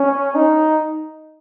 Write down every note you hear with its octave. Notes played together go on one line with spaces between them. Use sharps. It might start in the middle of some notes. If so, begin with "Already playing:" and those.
Already playing: C#4
D#4